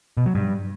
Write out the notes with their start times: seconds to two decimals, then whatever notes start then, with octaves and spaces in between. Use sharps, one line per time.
0.17 B2
0.26 F#3
0.35 G2